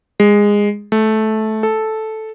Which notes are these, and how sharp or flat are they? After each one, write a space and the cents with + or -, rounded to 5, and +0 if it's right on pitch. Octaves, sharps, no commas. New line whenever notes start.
G#3 -15
A3 -15
A4 -5